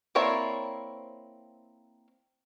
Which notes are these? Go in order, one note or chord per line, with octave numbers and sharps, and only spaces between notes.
A#3 C4 E4 C#5 D5